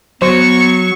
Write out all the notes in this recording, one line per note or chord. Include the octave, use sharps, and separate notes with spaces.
F#3 B3 C5 C#6